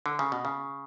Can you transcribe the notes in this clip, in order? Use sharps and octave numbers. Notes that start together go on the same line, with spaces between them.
D3
C#3
B2
C#3